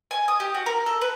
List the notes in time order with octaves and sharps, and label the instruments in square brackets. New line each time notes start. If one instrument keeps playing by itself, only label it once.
[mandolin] G#5
D#6
G4
F#4
A#4
A4
B4